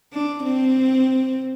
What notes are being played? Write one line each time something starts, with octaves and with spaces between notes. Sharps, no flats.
D4
C4